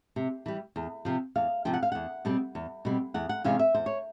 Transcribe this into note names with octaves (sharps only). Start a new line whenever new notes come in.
C3
E3 G3
E2
C3 F3
E2 F5
C3 F3 G5
F#5
F5
E2 F#5
B2 G3 C4
E2
B2 G3 C4
E2 F#5
F#5
C3 E3 G#3 C#4 F5
E5
E2 C5
C#5